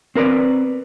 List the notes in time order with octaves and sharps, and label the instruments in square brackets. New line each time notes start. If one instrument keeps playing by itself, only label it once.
[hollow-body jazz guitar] C4 A#4 B4 D5